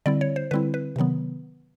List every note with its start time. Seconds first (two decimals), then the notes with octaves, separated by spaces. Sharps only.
0.06 D3 G3 C4 E4 D5
0.21 C#5
0.36 C5
0.51 D3 G3 C4 E4 B4
0.74 B4
0.96 C3 D#3 F#3 B3